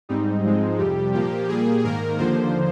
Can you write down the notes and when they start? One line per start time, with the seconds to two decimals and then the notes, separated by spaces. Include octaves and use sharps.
0.09 G#2 G3 C4 D#4
0.44 G#2 F3 G#3 C4
0.78 F2 C3 G3 G4
1.13 A#2 F3 A#3 G4
1.49 A#2 G3 A#3 G#4
1.84 G#2 D#3 A#3 A#4
2.19 D#2 D3 F3 A#3 C5